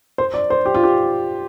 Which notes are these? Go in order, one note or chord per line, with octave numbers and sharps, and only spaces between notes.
C5
D5
C5
G4
F4
G4